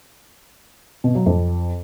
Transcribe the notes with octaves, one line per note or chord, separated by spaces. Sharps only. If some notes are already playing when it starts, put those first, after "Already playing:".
B2
F#3
F2